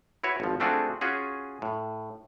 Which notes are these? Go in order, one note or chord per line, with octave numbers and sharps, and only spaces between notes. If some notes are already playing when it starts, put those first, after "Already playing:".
E4 F#4 B4 C#5
G#1 F3
A3 C4 D4 F4 F#4 G#4
C#4 F4 F#4 G#4
A2